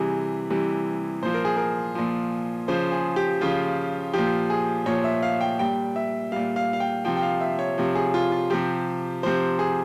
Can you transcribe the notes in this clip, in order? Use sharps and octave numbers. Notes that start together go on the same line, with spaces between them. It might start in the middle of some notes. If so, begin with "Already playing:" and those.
Already playing: C3 E3 G3 G#4
C3 E3 G3
A#2 F3 C5
A#4
G#4
A#4
A#2 F3
C#3 F3 C5
G#4
G4
C#3 F3 F4
A#2 F3 G4
G#4
A#2 F3 C#5
E5
F5
G5
A#2 G3 G5
E5
A#2 G3 F5
F5
F5
G5
C3 F3 G5
G5
F5
E5
C#5
C3 F3
G#4
F4
F4
C3 F3 G4
C3 F3 C5
G#4